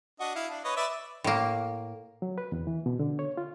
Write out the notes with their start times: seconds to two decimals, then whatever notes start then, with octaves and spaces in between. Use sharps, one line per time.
0.20 D4 F#4 D#5
0.36 E4 F5
0.49 D4
0.64 B4 C#5 D#5
0.76 B4 D5 E5
1.24 A2 A#3
2.22 F#3
2.38 B4
2.52 E2
2.67 E3
2.86 B2
2.99 D3
3.19 C#5
3.37 F4